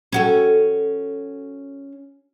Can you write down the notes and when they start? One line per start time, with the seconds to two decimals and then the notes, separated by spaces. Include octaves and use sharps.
0.12 C#4 F#4 A4